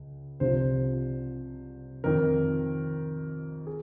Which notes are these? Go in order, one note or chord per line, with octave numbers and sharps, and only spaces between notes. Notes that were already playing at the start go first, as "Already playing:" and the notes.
Already playing: C#2
C2 C3 F3 C5
F2 D#3 A#4
G#4